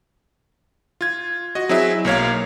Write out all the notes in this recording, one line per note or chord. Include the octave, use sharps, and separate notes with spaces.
F4 G#6
F#4 D#5
F#3 C4 E4 G#4 E5
B1 A#3 C#5 F5